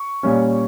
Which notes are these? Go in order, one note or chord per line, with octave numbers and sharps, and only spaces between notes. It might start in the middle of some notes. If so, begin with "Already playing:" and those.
Already playing: C#6
A#2 G3 C#4